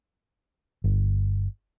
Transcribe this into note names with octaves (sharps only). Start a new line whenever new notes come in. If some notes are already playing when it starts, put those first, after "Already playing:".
G1